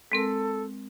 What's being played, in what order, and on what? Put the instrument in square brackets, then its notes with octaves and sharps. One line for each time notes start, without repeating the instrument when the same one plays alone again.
[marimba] G#3 C4 A#4 [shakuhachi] A4